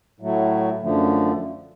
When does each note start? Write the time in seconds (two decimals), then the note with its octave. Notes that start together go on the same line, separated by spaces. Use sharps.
0.20 A2 F#3 A3
0.82 F#2 D3 F3 A3